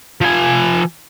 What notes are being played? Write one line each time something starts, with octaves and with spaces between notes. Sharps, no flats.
F3 G#5